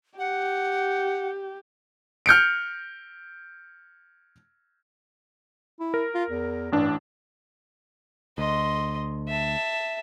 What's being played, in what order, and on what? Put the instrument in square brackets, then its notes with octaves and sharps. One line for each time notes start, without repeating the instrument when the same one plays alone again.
[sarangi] G4 [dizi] F#5
[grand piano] F6 G6 C#7 D7
[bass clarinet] E4
[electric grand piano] A#4
[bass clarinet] F4
E2
[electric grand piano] A1 D4 [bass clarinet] G2
[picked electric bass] D2 [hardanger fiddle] D#5 C6
[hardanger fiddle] E5 A5